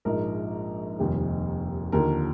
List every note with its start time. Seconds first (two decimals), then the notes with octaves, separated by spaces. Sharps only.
0.05 A#1 G#2 F3 G#3 A#4
0.99 F1 D#2 D#3 G3 A#3
1.92 D#2 D3 F3 A#3 A#4